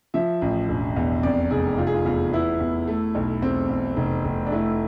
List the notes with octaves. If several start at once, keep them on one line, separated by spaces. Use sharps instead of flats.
F3 E5
A1
E1
E2
F2 D5
F1 G#4
F1 F4
G#4
F4
E2 F4
B3 E4
E2
A3
B1
E2 C4
E2
F1
F1
D4
A3 E4